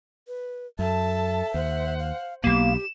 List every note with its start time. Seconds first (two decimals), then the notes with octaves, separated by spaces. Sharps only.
0.28 B4
0.79 F#2 A4 E5 A5
1.54 D#2 C5 F#5
1.99 F5
2.44 B1 B2 A#3 G4 E7